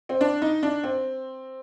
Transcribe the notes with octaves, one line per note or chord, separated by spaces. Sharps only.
C4
D4
D#4
D4
C4